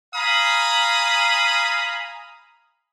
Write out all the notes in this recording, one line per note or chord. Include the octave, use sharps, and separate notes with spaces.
F5 G#5 A#5 B5 D#6